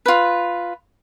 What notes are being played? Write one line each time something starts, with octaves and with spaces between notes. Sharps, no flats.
F4 B4